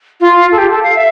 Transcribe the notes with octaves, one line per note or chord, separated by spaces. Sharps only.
F4
A4
G4
A4
F5
E5